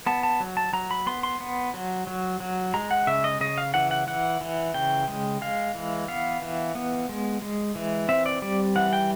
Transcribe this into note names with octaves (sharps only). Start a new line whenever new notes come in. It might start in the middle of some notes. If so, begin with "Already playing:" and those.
B3 A5
A5
F#3
A5
F#3 A#5
B5
B3 C6
C6
B3
F#3
F#3
F#3
G#3 A#5
F#5
C#3 E5
D#5
C#3 D#5
F5
E3 F#5
F#5
E3 F#5
E3
C#3 G5
G#3
G#3 F5
E3
B3 F5
E3
B3
G#3
G#3
E3
C4 E5
D5
G3 D5
E3 F#5
G5